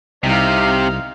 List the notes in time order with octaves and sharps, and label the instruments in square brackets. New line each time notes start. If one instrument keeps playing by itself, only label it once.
[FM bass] C2 [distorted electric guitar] C3 [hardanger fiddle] D#4 F5